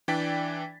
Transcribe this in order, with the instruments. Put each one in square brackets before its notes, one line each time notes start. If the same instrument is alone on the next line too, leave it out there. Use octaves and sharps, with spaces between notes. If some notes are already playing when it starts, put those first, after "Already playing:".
[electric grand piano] E3 D4 D5 G5 A6 B6